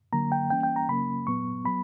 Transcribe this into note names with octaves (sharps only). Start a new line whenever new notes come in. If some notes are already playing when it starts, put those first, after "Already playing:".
D3 F#3 A#3 A#5
G5
E3 G3 A#3 C#4 G5
G5
A#5
C#3 F#3 A#3 C#4 B5
A#2 F#3 B3 C#6
F#3 B3 B5